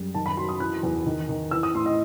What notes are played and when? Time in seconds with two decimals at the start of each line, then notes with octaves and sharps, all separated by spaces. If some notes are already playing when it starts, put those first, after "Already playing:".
Already playing: F#2 G3
0.15 D#3 A5
0.26 B5
0.37 F#3 C6
0.49 D#6
0.60 E3 F#6
0.83 E2
1.06 D#3
1.29 D#3
1.51 E3 E6
1.63 D#6
1.75 A2 C6
1.86 D#5